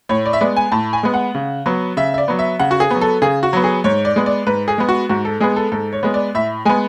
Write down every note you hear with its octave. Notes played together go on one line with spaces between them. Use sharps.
A2 C#5
D5
E5
G#3 B3 D5
G#5
A2 A5
G#5
G#3 B3
F#5
C#3
F#3 B3
C#3 E5
E5
D5
F#3 B3
E5
C#3 F#5
F#4
G#4
F#3 B3
A4
C#3 G#4
F#4
F#3 B3
G#4
G#2 C#5
D5
G#3 B3
D5
G#2 B4
G#4
G#3 B3
F#4
G#2 F#4
A4
G#3 B3 G#4
A4
G#2 A4
C#5
G#3 B3
D5
A2 E5
G#3 B3 G#5